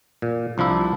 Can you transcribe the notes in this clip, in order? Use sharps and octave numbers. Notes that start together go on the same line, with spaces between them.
A#2
C2 F3 D4 E4 E5